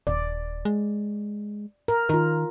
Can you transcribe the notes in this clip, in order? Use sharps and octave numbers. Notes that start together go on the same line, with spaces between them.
D#1 D5
G#3
A#4
D#3 F4 A#4